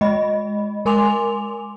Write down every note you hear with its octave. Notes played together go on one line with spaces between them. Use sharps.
G#3 D#5 B5
G#3 A#4 G#5 C6 D6 F7